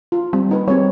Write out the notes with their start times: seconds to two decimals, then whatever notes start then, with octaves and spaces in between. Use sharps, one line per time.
0.12 F4
0.33 G3 C4
0.49 A#3 D#4 B4
0.68 G3 C4 G#4 C#5